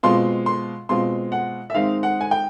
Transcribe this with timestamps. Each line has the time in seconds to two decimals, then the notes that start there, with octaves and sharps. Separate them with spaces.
0.03 B2 G#3 C4 F4 C6
0.46 C6
0.89 B2 G#3 C4 F4 C6
1.32 F#5
1.70 E5
1.74 D#3 G#3 C4 D#4 F5
2.03 F#5
2.21 G#5
2.31 G5